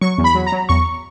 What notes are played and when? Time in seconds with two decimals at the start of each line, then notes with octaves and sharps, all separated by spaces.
0.01 F#3 C#6
0.18 E2
0.24 B5
0.35 F#3
0.47 A#5
0.52 F#3
0.69 E2 C#6